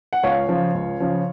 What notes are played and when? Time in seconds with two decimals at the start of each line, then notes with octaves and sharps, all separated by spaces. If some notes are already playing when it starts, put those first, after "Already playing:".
0.13 F#5
0.23 C#2 C#5 F5
0.49 C#3 F3
0.74 C#2
1.00 C#3 F3